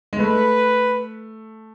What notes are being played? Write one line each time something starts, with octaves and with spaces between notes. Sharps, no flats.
G#3
A3 B4